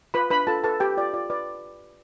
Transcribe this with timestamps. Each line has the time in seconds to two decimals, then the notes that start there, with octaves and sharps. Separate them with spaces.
0.14 F4 B4 B5
0.30 D4 B4 B5
0.47 F4 A4 A5
0.64 A4 B4 A5
0.80 G4 B4 G5
0.97 F4 D5
1.14 F4 D5
1.30 B4 D5